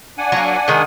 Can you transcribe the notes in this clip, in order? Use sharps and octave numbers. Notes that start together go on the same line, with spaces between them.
D4 F#5 G#5
F#3 A#3
D#3 G#3